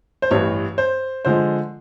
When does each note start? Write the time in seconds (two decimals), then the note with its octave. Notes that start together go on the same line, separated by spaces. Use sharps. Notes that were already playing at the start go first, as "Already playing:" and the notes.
0.22 C5
0.31 A1 G2 E3 C#5
0.78 C5
1.25 D3 F3 G#3 C5